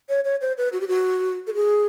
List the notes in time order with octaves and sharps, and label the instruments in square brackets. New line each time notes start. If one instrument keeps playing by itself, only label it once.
[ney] C#5
C#5
C5
B4
F#4
G4
F#4
A4
G#4